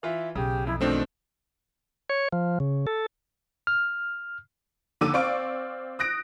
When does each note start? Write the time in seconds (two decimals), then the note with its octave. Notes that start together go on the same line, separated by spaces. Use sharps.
0.03 E3 F4 E5
0.35 B1 C#3 G4
0.67 F2 E4
0.81 B2 D#3 F3 A3 C4 D4 C5
2.10 C#5
2.33 F3
2.60 C#3
2.87 A4
3.67 F6
5.01 D#2 D3 D6 E6 D#7
5.14 C4 D5 F5 C#6 D7
5.99 D#6 F#6 A#6 D7